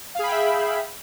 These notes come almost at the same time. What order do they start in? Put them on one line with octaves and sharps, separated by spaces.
F5 G#4 B5 G5 E5